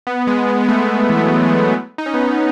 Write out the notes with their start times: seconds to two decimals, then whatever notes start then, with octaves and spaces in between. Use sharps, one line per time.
0.07 B3
0.27 G#3
0.48 G#3
0.61 G#3
0.69 A3
0.89 G#3
1.09 E3
1.17 F#3
1.45 G#3
1.98 D#4
2.06 C#4
2.14 B3